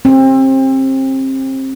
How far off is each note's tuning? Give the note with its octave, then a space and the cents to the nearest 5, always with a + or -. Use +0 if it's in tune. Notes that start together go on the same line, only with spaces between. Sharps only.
C4 +30